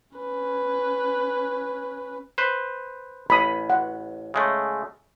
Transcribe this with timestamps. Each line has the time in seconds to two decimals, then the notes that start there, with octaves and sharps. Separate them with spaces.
0.17 C#4 B4
2.38 B4 C5
3.30 A1 B5 D#6
3.70 F#5
4.34 C#3 G#3 A3